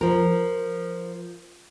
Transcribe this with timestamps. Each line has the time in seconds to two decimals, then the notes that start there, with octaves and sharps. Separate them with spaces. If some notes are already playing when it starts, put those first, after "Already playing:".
0.01 F3 A#4